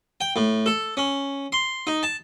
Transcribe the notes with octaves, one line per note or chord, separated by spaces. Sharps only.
G5
A2
A4
C#4
C6
D#4
A5